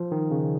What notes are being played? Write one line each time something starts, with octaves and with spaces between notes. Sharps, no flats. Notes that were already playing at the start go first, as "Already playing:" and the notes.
Already playing: F3
D#3
C#3